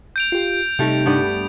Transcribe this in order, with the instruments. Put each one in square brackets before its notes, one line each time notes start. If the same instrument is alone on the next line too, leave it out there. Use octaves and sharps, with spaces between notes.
[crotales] G6 D7 F7
[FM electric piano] F4 G4
[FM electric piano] C3 D#4 [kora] G3 A3
[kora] G2 B3 D5